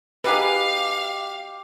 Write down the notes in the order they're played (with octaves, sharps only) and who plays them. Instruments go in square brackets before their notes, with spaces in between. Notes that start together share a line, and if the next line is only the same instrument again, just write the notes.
[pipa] B2 D#4 G#4 [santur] G4 D#5 F#5 [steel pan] B4 [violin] F5